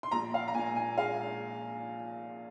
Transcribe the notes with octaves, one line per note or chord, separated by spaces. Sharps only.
C6
A#1 A#5
F5
A#5
A#2 G#5
G#5
G#3 F5